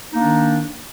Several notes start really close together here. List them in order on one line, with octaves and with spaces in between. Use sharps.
D#4 A#3 D4 D#3